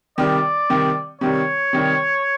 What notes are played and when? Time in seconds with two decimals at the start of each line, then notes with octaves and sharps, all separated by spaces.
0.18 C3 D#3 G3 D5
0.70 C3 D#3 G3
1.21 C3 D#3 G3 C#5
1.73 C3 D#3 G3